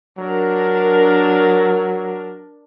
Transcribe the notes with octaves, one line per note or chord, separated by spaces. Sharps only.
F#3 D4 A#4